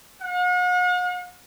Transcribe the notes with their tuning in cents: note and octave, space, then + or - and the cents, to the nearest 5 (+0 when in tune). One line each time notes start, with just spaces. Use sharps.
F#5 -45